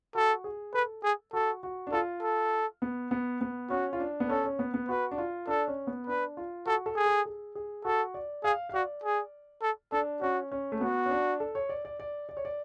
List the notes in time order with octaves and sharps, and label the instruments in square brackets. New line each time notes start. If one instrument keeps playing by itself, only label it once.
[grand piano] F#4 [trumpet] A4
[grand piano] G#4
[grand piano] A4 [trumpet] B4
[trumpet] G#4
[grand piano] F#4 [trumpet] A4
[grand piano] F#4
D4
[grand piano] F4 [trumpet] A4
[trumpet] A4
[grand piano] B3
B3
B3
[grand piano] C#4 [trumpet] F#4
[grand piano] F4
D4
B3
[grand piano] C#4 [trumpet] A4
[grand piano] C#4
B3
B3
[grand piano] F#4 [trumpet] B4
[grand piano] D4
F4
[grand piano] D4 [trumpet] A4
[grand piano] C#4
B3
[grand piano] D4 [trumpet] B4
[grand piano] F4
[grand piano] F#4 [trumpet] A4
[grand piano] A4
[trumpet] G#4
[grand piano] A4
G#4
G#4
[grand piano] F#4 [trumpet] A4
[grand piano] D5
[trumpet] G#4 [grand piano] F5
[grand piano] F5
[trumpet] F#4 [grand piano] D5
[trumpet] G#4
A4
[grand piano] D4 [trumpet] A4
[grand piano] C#4 [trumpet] F#4
[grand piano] C#4
A3
[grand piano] B3 [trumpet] F#4
[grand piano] C#4
D4
A4
C#5
D5
D5
D5
D5
C#5
D5